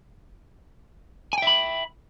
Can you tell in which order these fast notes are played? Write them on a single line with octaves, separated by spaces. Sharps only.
G#5 G5 E5 B5